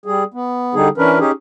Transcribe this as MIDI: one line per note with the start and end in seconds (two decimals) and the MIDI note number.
0.06 0.24 55
0.06 0.24 68
0.34 0.75 59
0.75 0.89 50
0.75 0.89 55
0.75 0.89 63
0.75 0.89 68
0.98 1.19 52
0.98 1.19 61
0.98 1.19 62
0.98 1.19 70
0.98 1.19 71
1.19 1.31 61
1.19 1.31 63
1.19 1.31 67
1.19 1.31 68